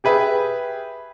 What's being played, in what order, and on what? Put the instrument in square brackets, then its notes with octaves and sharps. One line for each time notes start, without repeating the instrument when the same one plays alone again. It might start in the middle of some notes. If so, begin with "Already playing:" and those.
[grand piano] G4 G#4 B4 E5